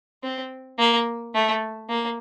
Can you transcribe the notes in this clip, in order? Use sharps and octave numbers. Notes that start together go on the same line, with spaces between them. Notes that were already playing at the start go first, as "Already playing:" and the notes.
C4
A#3
A3
A#3